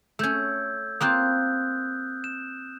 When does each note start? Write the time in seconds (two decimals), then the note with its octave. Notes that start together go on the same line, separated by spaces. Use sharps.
0.19 A3 C#4 E6 G6 G#6
1.01 A#3 C4 F4 D#6 F#6 G6
2.24 E7